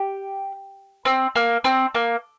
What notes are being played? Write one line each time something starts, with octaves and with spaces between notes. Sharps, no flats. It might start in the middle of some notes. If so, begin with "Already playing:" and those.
Already playing: G4
C4
A#3
C4
A#3